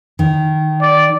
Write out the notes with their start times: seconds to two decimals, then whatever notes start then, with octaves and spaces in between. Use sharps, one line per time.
0.19 D#3
0.81 D5